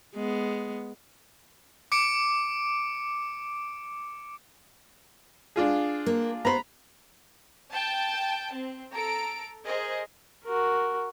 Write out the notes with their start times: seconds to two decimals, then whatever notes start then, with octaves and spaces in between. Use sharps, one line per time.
0.15 G#3 B3
1.92 D6 C#7 D7
5.56 D4 F4 G#4
6.06 A#3
6.45 B3 C5 A#5 B5
7.71 G5 A5
8.54 C4
8.92 A4 A#5 D7
9.66 G#4 A#4 C5 D#5
10.44 F#4 A#4